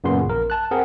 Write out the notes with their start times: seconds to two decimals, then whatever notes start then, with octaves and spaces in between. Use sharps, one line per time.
0.04 F#2 A#2 C#3 B3 C6
0.26 A#1 A#4
0.50 A5 F#6
0.71 C4 G#4 A#4 F#5